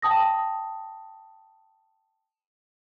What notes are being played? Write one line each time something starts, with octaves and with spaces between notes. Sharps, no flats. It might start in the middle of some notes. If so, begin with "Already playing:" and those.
G5 A5 D#6 A#6